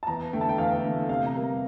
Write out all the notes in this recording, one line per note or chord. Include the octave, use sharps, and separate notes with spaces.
A5
E2 A#5
D3 A3 G5
A5
G5
E2 F5
D3 A3
C3 F5
A#5
G3 A#3
A#5